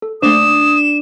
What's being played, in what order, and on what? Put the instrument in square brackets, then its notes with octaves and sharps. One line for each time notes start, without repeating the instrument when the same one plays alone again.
[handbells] A4
[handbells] A3 A#3 C5 [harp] D4 [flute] D#6 [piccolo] E7